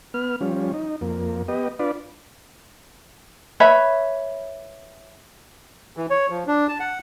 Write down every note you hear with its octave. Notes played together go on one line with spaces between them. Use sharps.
B3 F6
F3 G3 C#4
D#4
F2 A#3
B3 G4 D#5
D4 F4 B4 D5
B4 C#5 E5 B5
E3
C#5
F3
D4
A5
F#5